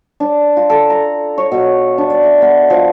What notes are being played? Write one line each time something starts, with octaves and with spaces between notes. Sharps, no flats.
D4
F4
A4
A#5
C#5
B2
D4
D5
E5
B3
F3